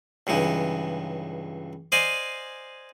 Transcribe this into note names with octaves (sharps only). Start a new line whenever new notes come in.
C#2 G2 E3 D#4
C5 D5 D#5 F5 G#5